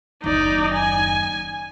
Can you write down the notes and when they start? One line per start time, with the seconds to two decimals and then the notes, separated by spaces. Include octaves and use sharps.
0.24 F#1 D#2 D#4 D5
0.74 G#5